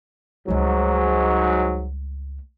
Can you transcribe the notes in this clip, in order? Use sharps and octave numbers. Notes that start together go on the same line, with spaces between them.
C#2 G#2 F#3 G3